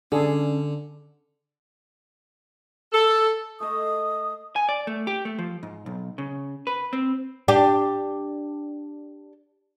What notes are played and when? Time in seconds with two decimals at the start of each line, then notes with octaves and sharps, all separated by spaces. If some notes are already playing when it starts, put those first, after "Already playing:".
0.12 D3 C#4 D4 G#4 A4
2.92 A4
3.60 A3 A4 D#5 D#6
4.56 G#5
4.69 D5
4.87 A3
5.07 G4
5.25 A3
5.39 F3
5.63 G#2
5.86 B1
6.18 C#3
6.67 B4
6.93 C4
7.48 D4 G4